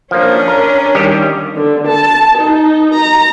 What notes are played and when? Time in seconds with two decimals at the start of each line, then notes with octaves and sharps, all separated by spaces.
0.11 F3 A#3 C#4 D4
0.48 A#4
0.95 D#3 G3 G4
1.56 D3
1.87 A5
2.38 D#4
2.94 A#5